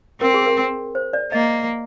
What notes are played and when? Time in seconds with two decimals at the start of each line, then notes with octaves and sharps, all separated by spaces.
0.21 C4 A#4
0.34 G#4
0.46 A#4
0.95 C5
1.13 D5
1.32 A#3 D#5